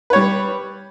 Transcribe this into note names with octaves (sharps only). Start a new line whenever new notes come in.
G3 B4 C#5